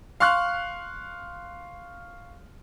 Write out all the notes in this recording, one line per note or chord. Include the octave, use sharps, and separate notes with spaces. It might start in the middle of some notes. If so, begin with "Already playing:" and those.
F5 C6 C#6 F6 F#6